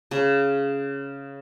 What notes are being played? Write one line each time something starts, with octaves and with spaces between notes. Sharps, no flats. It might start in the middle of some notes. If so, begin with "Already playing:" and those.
C#3